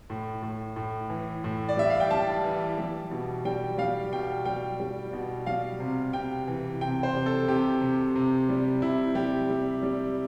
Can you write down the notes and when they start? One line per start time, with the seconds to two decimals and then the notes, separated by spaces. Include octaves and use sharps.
0.10 A2
0.43 A2
0.76 A2
1.10 E3
1.44 A2
1.69 D5
1.77 G3 E5
1.90 F5
2.00 G5
2.11 G3 A5
2.44 E3
2.78 G3
3.11 B2
3.45 G3 G5
3.78 G3 F5
4.12 B2 G5
4.45 G3 G5
4.80 G3
5.13 B2
5.46 G3 F5
5.80 C3
6.13 C3 G5
6.48 E3
6.81 C3 G5
7.03 C5
7.14 C3
7.26 A4
7.48 C3 G4
7.81 C3
8.15 C3
8.49 G3
8.82 C3 E4
9.15 G3 G4
9.50 G3
9.83 G3